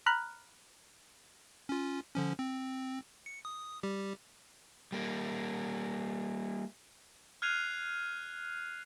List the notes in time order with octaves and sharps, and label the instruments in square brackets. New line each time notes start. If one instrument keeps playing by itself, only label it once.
[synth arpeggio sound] A#5 B5 F6 F#6
[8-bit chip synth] C#4 F4
D3 F3 C#4
C4
C#7
D#6
G3 G4
[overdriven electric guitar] G3 A#3
[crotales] F6 F#6 G#6 C7 D#7 F7